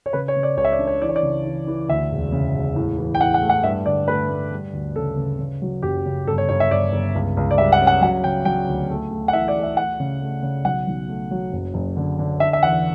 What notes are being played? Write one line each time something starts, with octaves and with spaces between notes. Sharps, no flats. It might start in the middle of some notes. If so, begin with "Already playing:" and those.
C#5
C#3 B4
C#5
C#3
D5
C#2 C#5
E5
D5
D4
C#5
E3 D5
C#5
D5
C#3
E3
E3
D2 E5
E1
C#3
E1
A2
E3
G5
A2 F#5
F#5
A3
F#5
G2 E5
D3 D5
A3 B4
A3
G3
D2
C#3 A4
C#3
C#3
F#3
F#1 G4
C#3
G1 A4
C#5
G1 C#5
E5
G1 D5
G1
C#2
C#2
D5
G3 E5
F#5
C#4
F#5
F#3 F#5
C#3 G5
F#3 G5
D2
A3
A3
F#5
E3 E5
D5
A3
E5
A3 F#5
C#3
A3
C#3
B1 F#5
B1
A3
F#3
F#1
F#1
D3
D3
D4 E5
E5
E2 F#5